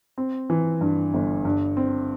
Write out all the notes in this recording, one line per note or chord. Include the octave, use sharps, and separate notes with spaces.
C4
E3
G2
G1
G2
C4